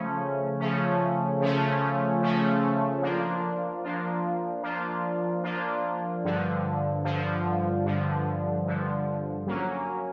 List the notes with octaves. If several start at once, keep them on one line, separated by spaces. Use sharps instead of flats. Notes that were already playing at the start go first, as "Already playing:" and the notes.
Already playing: C#3 F3 A3 C#4
C#3 F3 A3 C#4
C#3 F3 A3 C#4
C#3 F3 A3 C#4
F3 A#3 D4 F4
F3 A#3 D4 F4
F3 A#3 D4 F4
F3 A#3 D4 F4
G2 D3 F3
G2 D3 F3
G2 D3 F3
G2 D3 F3
F#3 A#3 C#4